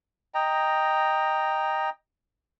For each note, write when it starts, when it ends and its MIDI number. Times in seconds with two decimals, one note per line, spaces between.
0.34 1.90 75
0.34 1.90 79
0.34 1.90 82